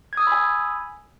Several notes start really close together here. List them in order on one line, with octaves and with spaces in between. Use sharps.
G#6 D#6 E6 B5 G#5